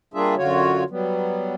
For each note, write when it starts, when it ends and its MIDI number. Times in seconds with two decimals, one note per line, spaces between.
0.14 0.35 55
0.14 0.35 58
0.14 0.35 62
0.14 0.35 65
0.14 0.35 68
0.14 0.35 76
0.37 0.84 42
0.37 0.84 50
0.37 0.84 65
0.37 0.84 66
0.37 0.84 73
0.90 1.55 54
0.90 1.55 55
0.90 1.55 59